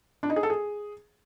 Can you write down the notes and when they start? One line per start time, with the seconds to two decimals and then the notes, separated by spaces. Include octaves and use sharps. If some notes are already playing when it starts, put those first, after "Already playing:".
0.23 D4
0.30 D#4
0.36 G#4
0.43 A4
0.50 G#4